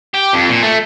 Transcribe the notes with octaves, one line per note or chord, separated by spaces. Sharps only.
G4
F2
A#2
A3